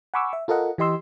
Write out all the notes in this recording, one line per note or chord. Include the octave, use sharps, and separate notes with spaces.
F#5 G#5 B5 C#6 D6 E6
E5
F4 A4 A#4 D#5 F#5
E3 G4 D#5 C6 E6